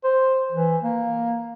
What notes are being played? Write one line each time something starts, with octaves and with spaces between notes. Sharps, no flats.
C5
E3
A#3